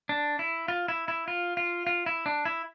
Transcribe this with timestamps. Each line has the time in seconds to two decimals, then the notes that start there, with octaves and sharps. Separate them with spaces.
0.09 D4
0.39 E4
0.68 F4
0.88 E4
1.08 E4
1.28 F4
1.57 F4
1.87 F4
2.06 E4
2.26 D4
2.45 E4